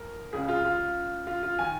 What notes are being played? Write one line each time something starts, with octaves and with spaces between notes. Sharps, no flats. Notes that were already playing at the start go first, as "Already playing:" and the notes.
Already playing: F1 A#4
C#2 C#3 G#4
F4
F4
F4
F4
D#3 G#5